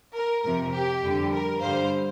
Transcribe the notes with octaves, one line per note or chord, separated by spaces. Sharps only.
A#4
F2 C3 F3 A#4
G4
F2 D3 G3
A#4
G2 D3 G3 C5 F5